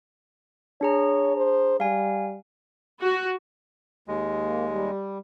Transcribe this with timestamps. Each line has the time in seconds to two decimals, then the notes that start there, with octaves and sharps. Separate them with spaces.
0.81 D4 G#4 C#5 A#5
1.37 C5
1.80 G3 F5 G#5
3.01 F#4
4.08 D#2 G#3
4.42 A#3
4.70 G3